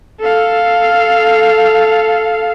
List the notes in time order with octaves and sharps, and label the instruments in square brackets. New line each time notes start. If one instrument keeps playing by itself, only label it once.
[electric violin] A4 F5